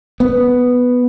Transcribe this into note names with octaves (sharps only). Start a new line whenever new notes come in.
B3